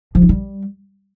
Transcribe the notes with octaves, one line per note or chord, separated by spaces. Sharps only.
F3
D#4
G3